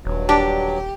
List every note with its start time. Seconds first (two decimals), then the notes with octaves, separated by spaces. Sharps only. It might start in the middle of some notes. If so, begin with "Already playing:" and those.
0.05 D#1 G2 F#3
0.29 D4 G4